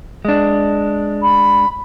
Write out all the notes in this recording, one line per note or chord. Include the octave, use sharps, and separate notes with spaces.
G#3 D4
B5